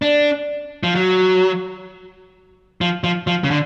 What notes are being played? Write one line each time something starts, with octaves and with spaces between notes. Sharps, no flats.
D4
F3
F#3
F3
F3
F3
C#3
D3